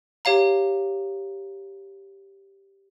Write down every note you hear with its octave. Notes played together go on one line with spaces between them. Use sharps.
G4 C#5 F5 A#5